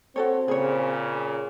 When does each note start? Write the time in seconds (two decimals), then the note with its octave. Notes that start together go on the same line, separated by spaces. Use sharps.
0.16 C4 F#4 A4 C#5
0.48 A#2 C#3 G#4 C#5